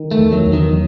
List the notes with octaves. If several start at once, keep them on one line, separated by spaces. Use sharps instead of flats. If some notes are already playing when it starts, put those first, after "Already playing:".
Already playing: D#3
A3
E2
F#3
E2
D#3